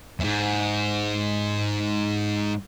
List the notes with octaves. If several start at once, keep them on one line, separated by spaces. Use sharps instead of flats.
E2 G#2